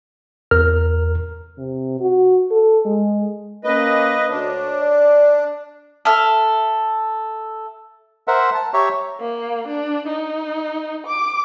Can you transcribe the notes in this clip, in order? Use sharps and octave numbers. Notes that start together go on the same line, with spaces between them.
E2 A#4 F6
C3
F#4
A4
G#3
A#3 C#4 B4 D#5
D2 D4 C#5
D5
A4 E5 F6
A#4 C5 E5 F#5
A5
G4 C#5 E5 A#5 C#6
A#3
D4
D#4
D6